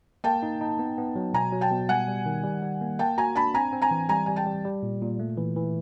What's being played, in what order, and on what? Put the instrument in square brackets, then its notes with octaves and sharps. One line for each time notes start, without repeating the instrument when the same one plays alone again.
[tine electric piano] A#3 [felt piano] G5 A5
[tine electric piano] D#4
D#4
B3
B3
F#3
[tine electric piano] B2 [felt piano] G#5 A#5
[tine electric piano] F#3
[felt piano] G5 A5
[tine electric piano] B2
[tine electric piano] G3 [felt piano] F#5 G#5
[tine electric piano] G3
D#3
G3
G3
A#3
[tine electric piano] A#3 [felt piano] G5 A5
[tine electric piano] F#4 [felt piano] G#5 A#5
[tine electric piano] D4 [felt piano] A5 B5
[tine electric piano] C4 [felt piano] G#5 A#5
[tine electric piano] C4
[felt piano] G#5 A#5
[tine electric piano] E3
[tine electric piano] G3 [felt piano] G#5 A#5
[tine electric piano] G3 [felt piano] G#5
[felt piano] G5 A5
[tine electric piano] G3
G3
A#2
A#2
A3
E3
E3